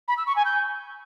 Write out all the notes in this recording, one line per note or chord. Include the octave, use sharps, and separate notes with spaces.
B5
E6
C#6
G#5
G6